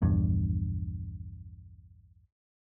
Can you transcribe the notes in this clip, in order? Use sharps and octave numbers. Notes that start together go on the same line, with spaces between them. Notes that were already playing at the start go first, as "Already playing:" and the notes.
A#1 E2 G2